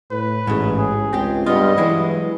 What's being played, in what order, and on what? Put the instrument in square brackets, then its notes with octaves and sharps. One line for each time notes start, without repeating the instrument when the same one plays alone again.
[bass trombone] A2 [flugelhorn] B4
[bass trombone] A1 [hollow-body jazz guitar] G#2 C#3
[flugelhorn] G#4
[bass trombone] C#2 [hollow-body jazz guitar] C4 G4
[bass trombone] G2 [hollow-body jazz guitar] B3 F4 [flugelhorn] D#5
[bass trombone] E3 [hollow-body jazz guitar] F#3 G#3 E4